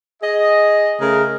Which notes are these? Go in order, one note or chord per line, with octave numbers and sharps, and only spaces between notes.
G#4 D#5
C#3 A3 G#4 A#4